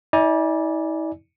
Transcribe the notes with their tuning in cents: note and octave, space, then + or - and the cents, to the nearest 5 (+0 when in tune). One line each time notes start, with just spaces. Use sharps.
E4 -45 D5 +0 G#5 +5